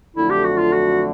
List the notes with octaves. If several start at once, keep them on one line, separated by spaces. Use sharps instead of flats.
F2 D3 F#3 A3 E4
G4
F#4
F4
F#4